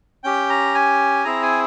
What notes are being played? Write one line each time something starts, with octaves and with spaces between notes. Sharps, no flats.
C#4 G4 G5
A#5
G#5
C4 E4 G#4 A#5
G#5